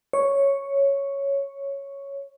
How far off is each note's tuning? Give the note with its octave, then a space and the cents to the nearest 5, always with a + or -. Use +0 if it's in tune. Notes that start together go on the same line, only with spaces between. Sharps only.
C#5 +0